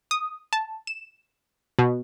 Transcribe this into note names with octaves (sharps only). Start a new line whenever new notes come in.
D#6
A5
E7
B2